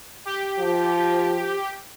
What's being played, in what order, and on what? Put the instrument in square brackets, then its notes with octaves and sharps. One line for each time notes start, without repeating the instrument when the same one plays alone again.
[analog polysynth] G4
[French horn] F3